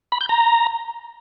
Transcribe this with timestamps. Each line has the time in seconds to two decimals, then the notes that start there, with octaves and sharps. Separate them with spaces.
0.12 B5
0.21 G6
0.29 A#5